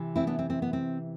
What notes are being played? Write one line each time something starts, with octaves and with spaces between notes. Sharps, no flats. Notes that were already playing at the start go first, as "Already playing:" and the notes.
Already playing: C3 E3
C4 E4
B3 D4
C4
C4
B3
C4